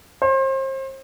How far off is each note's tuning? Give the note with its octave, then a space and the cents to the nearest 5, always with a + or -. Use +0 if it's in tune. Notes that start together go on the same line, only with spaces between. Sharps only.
C5 +35